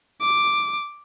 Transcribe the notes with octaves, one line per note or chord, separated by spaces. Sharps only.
D6